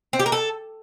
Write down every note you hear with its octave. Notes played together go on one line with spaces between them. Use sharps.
C4
G4
A#4
A4